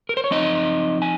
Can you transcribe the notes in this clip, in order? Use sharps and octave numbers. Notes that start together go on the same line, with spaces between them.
A#4
C5
C#5
F3 C4 D#4 D#5
G#5